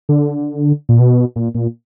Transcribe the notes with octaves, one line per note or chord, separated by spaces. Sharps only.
D3
A#2
B2
A#2
A#2